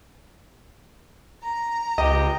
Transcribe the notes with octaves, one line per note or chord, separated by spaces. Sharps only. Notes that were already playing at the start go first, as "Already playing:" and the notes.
A#5
C#2 G4 D#5